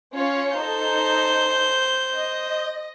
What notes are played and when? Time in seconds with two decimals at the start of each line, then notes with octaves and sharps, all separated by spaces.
0.15 C#4 F4 C#5
0.57 D#4 A4 C5 G6
2.14 D#5